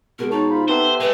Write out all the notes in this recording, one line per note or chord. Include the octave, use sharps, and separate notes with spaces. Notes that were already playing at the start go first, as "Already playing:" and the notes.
B2 G#3 A#4
D#4 C#5 A5
F4 C5 B5
B3 G4 A4 B4 C5 E5
G#3 A3 B4